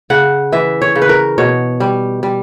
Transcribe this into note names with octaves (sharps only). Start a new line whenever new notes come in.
C#3 F#5
E3 E5
C#5
C#3
B4
A#4
B2 C#5
G3
G3